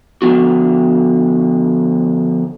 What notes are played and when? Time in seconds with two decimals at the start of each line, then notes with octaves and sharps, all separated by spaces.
0.22 D3 F3 B3 F#4